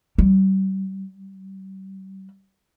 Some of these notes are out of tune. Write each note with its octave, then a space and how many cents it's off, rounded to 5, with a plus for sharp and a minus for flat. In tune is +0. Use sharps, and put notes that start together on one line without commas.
G3 -40